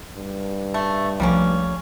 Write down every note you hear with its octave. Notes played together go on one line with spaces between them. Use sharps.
G2
A3
C2 F3 G3 A3 A#3 C#4